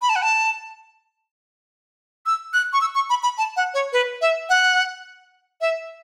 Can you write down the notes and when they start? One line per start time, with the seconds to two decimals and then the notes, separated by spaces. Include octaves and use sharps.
0.02 B5
0.09 A5
0.16 F#5
0.22 A5
2.26 E6
2.54 F#6
2.73 C#6
2.81 E6
2.95 C#6
3.10 B5
3.23 B5
3.38 A5
3.57 F#5
3.74 C#5
3.93 B4
4.21 E5
4.49 F#5
5.61 E5